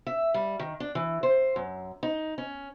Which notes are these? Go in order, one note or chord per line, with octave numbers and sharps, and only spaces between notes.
E5
G3
D#3
D4
E3
C5
F#2
D#4
C#4